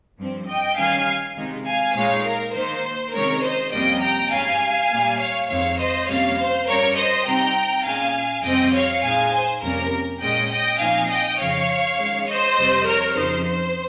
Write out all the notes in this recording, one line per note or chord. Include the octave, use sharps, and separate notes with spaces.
G2 F3 C4
D#5 G5
D#3 G3 C#4 F5 G#5
C3 D#3 G#3 D#4
F5 G#5
A#2 G#3 D#4 C#5 F5
A#4
D#3 A#3 D#4 C5
C3 D#3 G#3 C#4 A#4 C#5
C5 D#5
F2 C3 G3 A#3 C#4 D#5 G5
G5 A#5
G#2 G3 C#4 F5 G#5
A#2 G3 A#3
C#5 F5
F2 D#3 G#3 C4 C#5 F5
C5 D#5
F2 C3 G3 A#3 C#4 C#5 F5
C5
G2 G3 C#4 A#4 C#5
C5 D#5
C3 G3 C4 D#4 G5 A#5
A#2 G#3 C#4 F5 G#5
F2 C3 G3 C4 D#5 G5
C#5 F5
A#2 G#3 D#4 F5 G#5
C5
F2 C3 G3 A#3 C#4 A#4
A#2 G#3 C#4 D#5 G5
D#5 G5
A#2 F3 C4 D#4 F5 G#5
D#5 G5
F2 C#3 F3 C#5 F5
D#3 G#3 C#4
C5 D#5
F2 C3 G3 C4
A#4 C#5
F2 C#3 F3 C4 D#4 C5
C5